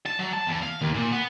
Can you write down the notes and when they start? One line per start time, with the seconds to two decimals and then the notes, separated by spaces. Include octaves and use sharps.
0.06 A5
0.19 F#3
0.33 A5
0.47 E2
0.62 F5
0.81 D#2
0.94 A#2
1.12 B3